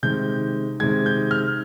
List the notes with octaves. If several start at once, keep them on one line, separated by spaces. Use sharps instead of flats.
C3 D#3 G#3 G6
C3 D#3 G#3 G#6
G6
F6